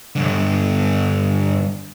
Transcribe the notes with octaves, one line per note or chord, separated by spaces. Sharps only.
G2 D3